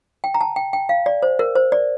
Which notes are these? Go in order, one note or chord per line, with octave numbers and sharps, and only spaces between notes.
G5
A#5
A5
G5
G5
F5
D5
C5
A#4
C5
D5